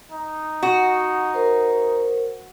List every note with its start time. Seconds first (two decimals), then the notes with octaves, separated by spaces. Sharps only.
0.12 D#4
0.63 F#4
1.34 A#4 C5